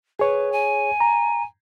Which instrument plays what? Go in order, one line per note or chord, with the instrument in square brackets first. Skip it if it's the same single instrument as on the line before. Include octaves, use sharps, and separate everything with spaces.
[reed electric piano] G#4 C#5 [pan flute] B4
[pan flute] G#5
[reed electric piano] A#5